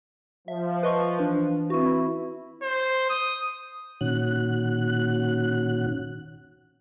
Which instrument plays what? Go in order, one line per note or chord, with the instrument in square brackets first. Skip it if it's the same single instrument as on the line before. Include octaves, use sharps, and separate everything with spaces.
[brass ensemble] F3 [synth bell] E5
[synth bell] B4 D#5 C#6
[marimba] E3 [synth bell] D4 B4
[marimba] C4 B4 C#6 [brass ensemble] E4 [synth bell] F#4
[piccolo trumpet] C5
D#6
[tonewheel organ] A#2 D#3 C#4 F#4 F#6